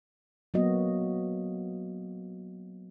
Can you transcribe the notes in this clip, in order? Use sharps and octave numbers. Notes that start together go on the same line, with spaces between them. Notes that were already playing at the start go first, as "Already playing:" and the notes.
F#3 A#3 B3 F#4 D#5